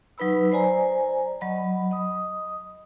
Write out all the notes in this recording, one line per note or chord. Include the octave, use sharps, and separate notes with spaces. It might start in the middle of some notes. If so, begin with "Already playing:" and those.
F#3 D#4 B4 B5 E6
C5 D5 G#5 A#5
F#3 D#5 B5
D#5 D#6